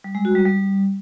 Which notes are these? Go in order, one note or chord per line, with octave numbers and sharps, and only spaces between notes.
G3
G#3
F#4
G3
G3